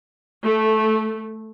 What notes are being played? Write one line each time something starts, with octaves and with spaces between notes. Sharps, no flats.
A3